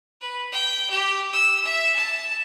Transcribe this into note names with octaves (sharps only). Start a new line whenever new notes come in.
B4
G5
G4
E6
E5
A5